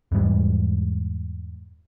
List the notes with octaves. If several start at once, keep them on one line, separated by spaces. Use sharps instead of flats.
E2 G#2 G3 G#3